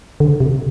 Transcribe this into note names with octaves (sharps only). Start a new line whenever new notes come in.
D3
C3